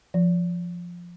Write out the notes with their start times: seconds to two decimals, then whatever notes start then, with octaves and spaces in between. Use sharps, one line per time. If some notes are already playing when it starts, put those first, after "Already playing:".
0.14 F3